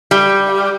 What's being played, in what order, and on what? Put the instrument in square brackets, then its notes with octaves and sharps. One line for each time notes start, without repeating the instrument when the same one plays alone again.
[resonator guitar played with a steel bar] G3